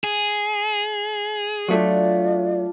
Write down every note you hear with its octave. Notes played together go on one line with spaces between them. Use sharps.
G#4
F#3 A3 D4 F4 D5 D#6